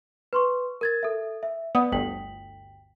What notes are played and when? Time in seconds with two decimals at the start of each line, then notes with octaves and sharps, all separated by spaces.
0.33 B4 C6 C#6
0.81 A#4 G#6 A6
1.03 A4 E5
1.43 E5
1.75 B3 D5 D#6
1.92 G1 D2 G5 B6 F#7